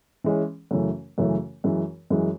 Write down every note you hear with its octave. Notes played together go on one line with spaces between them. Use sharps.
E3 G#3 C#4
F#2 C#3 E3 A3 C#4
F#2 C#3 E3 A3 C#4
F#2 E3 G#3
F#2 E3 G#3